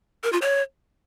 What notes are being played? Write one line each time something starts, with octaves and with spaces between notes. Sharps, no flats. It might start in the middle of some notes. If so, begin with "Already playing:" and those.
A#4
F4
C#5